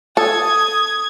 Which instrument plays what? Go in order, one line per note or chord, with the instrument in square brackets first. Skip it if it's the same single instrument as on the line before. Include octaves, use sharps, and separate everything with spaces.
[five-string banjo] A4 [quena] D#6 [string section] G#6